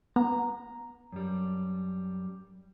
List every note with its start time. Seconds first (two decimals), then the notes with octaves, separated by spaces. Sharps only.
0.16 B3 A#5
1.12 F#2 G3